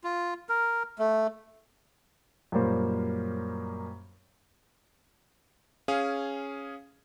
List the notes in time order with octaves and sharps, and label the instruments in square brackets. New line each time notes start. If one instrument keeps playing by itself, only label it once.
[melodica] F4
A#4
A3
[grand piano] F#2 A#2 G3 A#3 C5
[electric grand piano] C#4 G#4 F5